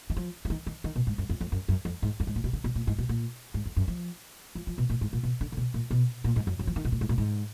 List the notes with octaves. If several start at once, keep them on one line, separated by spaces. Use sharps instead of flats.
D#3
F3
F3
D#3
D#3
D#3
B2
G#2
F#2
F2
F2
F#2
F#2
F2
G#2
F#2
G#2
A#2
B2
D3
B2
A#2
G#2
B2
A#2
G#2
F2
F#2
F3
F3
F3
B2
A#2
G#2
A#2
B2
D3
D3
B2
A#2
B2
A#2
G#2
F#2
F#2
F3
D#3
B2
A#2
G#2
A#2
G#2